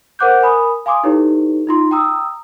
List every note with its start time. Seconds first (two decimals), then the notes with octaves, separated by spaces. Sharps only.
0.19 A#4 C5 F#5 D6 F#6 G6
0.41 A#4 G#5 B5 D#6
0.86 F5 G#5 C6 D6 D#6
1.04 D#4 E4 G4 A4 B4 C#5
1.67 D#4 F4 C6
1.91 G5 A#5 D#6 E6